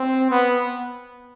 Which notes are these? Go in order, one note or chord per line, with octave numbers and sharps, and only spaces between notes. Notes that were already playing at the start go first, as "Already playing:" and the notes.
Already playing: C4
B3